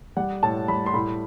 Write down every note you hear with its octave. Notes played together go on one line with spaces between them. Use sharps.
G3 F#5
A2 A5
G3 B5
C6
A2 B5